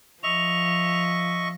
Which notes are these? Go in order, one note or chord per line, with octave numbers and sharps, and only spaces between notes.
F3 D#5 E5 C#6 F7